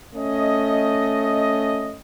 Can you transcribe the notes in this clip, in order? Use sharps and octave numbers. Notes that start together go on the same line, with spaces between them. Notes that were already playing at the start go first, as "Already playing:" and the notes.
A3 C#4 D#5